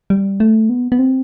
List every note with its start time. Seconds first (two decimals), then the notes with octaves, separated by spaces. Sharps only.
0.10 G3
0.40 A3
0.69 B3
0.92 B3
0.99 C4